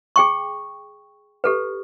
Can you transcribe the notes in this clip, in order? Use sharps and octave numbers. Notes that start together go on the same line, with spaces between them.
G#4 G5 C#6
G4 A4 B4